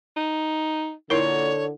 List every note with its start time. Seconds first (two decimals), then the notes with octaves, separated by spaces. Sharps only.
0.17 D#4
1.10 A#2 D3 D#4 E4 A#4 C#5